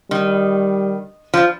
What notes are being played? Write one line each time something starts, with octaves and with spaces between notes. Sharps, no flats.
D#3 G3
F3